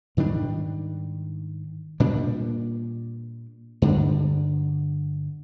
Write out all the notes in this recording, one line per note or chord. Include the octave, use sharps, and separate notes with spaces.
G#2 D#3 G3 D4
A#2 G3 D4
G2 D3 G3 D4